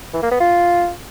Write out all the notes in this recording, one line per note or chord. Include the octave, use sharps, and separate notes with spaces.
E3
A#3
B3
F4